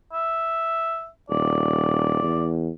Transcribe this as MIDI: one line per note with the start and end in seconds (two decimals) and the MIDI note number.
0.13 1.08 76
1.30 2.22 27
1.30 2.52 74
2.23 2.69 40